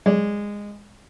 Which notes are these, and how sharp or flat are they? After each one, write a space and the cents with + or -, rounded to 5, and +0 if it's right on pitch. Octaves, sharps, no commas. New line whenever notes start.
G#3 -15 D5 -20